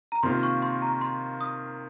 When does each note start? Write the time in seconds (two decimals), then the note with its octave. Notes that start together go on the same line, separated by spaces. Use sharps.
0.12 A#5
0.23 C3 D#3 A#3 F4 A#4 C6
0.43 C#6
0.62 C6
0.82 A#5
1.01 C6
1.41 D#6